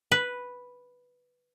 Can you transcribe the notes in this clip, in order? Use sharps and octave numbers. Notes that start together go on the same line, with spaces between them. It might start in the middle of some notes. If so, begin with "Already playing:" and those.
B4